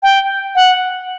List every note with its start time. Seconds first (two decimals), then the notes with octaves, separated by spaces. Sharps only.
0.03 G5
0.55 F#5